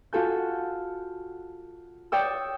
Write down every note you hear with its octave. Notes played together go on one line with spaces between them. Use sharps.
F4 F#4 A4 G#5 G6
C#5 D5 G5 D#6 E6